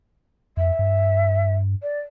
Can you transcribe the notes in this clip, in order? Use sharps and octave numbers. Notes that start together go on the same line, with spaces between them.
F2 E5
G2
D5